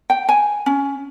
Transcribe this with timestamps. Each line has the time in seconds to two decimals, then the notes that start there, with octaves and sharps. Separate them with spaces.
0.10 G5
0.29 G#5
0.66 C#4